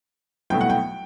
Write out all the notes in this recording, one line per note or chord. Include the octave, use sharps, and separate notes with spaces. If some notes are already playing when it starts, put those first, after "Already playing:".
C2 B2 F#3 A3 E4 G5
F#5
G5